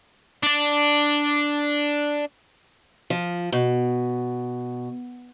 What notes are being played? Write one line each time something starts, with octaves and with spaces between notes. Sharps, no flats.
D4 D5
F3
B2